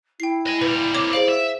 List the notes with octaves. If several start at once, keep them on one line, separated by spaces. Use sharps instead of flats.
E4 G5 C7
D#5 G#5
A#2 G3 B4
A#3 C4 C#5 D6 G#6
G#4 C5 D5 F5
E5